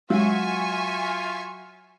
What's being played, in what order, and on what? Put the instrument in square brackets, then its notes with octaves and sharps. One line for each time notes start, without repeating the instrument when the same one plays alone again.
[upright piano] F#3 [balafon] G#3 [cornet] F4 [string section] E5 G#5 C#6